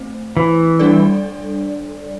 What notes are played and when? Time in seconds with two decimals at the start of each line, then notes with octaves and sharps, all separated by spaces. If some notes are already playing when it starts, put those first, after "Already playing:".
Already playing: A3 C4 C5
0.37 E3
0.79 G3 D4 A4 D5